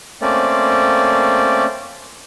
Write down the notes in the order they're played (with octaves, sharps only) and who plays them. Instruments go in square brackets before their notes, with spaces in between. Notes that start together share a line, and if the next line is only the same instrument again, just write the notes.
[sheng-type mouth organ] A3 A#3 C4 C#4 D5